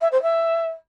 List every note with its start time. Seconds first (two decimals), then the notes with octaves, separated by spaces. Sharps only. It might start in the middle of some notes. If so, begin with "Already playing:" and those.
0.01 E5
0.12 C5
0.22 E5